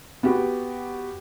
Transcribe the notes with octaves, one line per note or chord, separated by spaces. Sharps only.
B3 F#4 G4